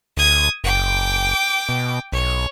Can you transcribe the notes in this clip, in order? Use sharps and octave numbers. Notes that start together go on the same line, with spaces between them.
D2 D#6 G#6
F#1 G5 D6
B2
B1 C#5